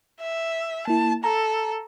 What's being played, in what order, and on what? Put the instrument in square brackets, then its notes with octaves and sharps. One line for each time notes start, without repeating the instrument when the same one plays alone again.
[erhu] E5
[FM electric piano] A#3 E4 [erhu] A5
[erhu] A4 [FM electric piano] A#5